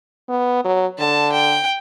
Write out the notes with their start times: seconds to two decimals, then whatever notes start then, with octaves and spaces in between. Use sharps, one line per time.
0.29 B3
0.65 F#3
0.99 D3 A5
1.32 G5